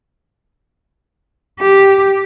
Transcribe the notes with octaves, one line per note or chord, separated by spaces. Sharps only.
G4